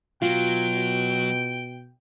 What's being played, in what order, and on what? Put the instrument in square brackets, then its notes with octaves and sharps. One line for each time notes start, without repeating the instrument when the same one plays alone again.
[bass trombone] B2 [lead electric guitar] F#3 [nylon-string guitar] F4 [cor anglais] G5